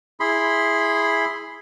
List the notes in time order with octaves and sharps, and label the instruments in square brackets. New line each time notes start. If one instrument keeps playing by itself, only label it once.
[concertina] E4 G#4 B5 C6